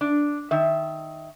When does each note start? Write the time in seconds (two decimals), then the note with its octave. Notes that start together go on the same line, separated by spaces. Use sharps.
0.01 D4
0.51 D#3 E5